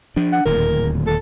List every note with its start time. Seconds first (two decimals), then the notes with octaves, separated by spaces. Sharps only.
0.16 F3 D4
0.32 F#5
0.45 D1 D#2 A#2 A#4
1.07 A4